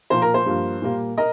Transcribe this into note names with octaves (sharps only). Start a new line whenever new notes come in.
A#2 F3 A#3 C5
A#4
C5
G2 F3 A#3
A#2 G3 A#3
A#4 D#5